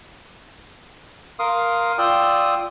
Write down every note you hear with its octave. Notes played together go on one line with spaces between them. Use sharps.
A#4 F5 C6 D#6
F4 D5 G5 D#6 E6